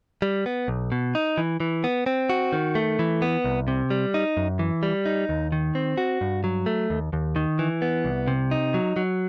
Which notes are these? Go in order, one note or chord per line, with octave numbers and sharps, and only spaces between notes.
G3
B3
B1
B2
D#4
E3
E3
B3
C4
F#4
D#3
A3
E3
B3
C2
C3
G3
D#4
F#2
E3
G3
D#4
D#2
D#3
C4
F#4
G2
F#3
A3
D#2
D#2
D#3
E3
B3
C2
C3
D#4
F#3
F#3